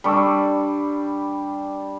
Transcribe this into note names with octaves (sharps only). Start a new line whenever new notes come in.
G3 D4 D5 B5 C#6 E6